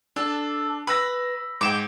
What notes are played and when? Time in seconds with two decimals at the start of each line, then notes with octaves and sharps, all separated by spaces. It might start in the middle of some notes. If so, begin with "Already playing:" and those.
0.16 D4 A4 A5
0.87 B4 B5 E6 A#6
1.61 G#2 G5 D6 E7